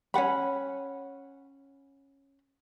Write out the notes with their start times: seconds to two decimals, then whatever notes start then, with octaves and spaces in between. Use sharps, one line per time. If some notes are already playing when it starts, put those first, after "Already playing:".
0.14 C#4 F#4 F#5 B5